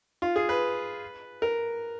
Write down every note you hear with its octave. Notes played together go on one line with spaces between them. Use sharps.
F4
G#4
B4
A#4